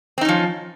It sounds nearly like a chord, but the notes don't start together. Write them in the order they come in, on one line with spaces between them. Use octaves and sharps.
C4 D#4 C#4 F3